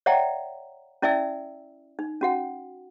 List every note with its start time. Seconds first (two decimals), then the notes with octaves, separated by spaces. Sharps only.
0.06 C#5 D5 E5 F#5 G5 A#5
1.02 C#4 E4 D5 E5 G#5 E6
1.99 D#4
2.21 C#4 F#4 F#5